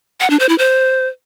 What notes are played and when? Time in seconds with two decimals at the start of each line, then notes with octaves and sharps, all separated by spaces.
0.21 F#5
0.30 D4
0.39 C5
0.49 E4
0.58 C5